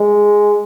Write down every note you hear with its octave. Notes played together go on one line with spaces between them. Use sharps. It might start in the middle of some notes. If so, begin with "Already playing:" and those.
Already playing: G#3